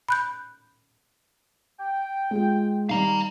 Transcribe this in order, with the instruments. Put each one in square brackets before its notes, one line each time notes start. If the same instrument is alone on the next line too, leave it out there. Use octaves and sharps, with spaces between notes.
[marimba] B5 F#6 G6
[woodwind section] G5
[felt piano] G#3 F4
[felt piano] D#3 G3 D#4 [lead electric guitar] F5 A#5